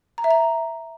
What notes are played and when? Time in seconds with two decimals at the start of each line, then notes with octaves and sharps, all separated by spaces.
0.18 A#5
0.24 E5
0.31 A#5